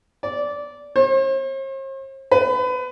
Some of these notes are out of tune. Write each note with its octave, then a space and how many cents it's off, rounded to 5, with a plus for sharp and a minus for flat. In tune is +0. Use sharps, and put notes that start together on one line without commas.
D5 -15
C5 +45
B4 +30